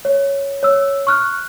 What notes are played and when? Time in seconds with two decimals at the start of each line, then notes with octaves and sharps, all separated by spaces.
0.05 C#5
0.63 C#5 E6
1.07 C#6 F6 F#6